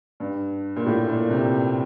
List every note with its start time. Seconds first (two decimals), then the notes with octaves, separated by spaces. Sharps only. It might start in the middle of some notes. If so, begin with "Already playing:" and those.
0.20 G2
0.76 A#2
0.86 A2
1.08 A#2
1.30 C3